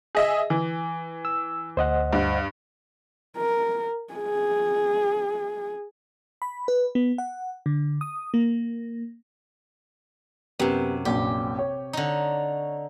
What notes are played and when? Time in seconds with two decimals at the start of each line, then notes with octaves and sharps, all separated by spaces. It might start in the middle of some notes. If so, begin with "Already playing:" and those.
0.15 G#4 D#5 E5
0.50 E3
1.25 E6
1.77 D2 C5 D#5 F#5
2.13 G2
3.37 A#4
4.14 G#4
6.42 B5
6.68 B4
6.95 B3
7.18 F#5
7.66 D3
8.01 D#6
8.34 A#3
10.59 F#2 C3 B3 G4
11.05 A#1 F#2 G4
11.59 C#5
11.93 D3 D#4